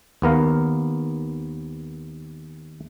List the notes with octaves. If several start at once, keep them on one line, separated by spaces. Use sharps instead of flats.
D#2 B3 A#4 F5